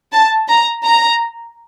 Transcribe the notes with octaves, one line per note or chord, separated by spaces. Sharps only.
A5
A#5
A#5